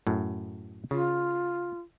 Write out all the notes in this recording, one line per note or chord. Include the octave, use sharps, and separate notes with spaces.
F#2 A2
C#3 F4